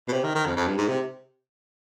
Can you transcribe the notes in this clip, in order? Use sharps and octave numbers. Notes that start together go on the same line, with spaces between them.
B2
C3
D#3
D#3
F2
F2
G2
G#2
C3